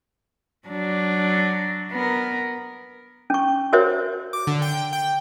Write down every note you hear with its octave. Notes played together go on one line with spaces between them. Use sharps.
F#3 D4
B3 A#4
C#4 C#6
F#4 G4 A#4 C5 C#5 E5
D6
D3
G5
G5